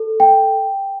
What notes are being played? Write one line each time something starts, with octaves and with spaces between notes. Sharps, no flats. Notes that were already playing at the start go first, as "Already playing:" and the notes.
Already playing: A4
G5